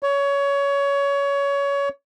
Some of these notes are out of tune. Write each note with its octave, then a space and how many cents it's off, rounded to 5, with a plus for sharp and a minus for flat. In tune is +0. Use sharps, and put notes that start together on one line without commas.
C#5 +20